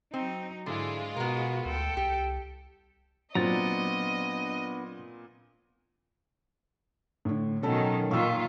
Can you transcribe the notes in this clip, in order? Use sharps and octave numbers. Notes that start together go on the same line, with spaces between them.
F#3 C4 D#4
G#2 D3 G#3 E4 F4
B2 B3 F#4 A#4
D2 A4 G5
C2 G4
A#2 F#3 B3 C4 D4 D#5 A#5 A6
A2 D3
B2 D#3 F#3 C#4 A4 A5
A#2 D#3 F4 C#6 E6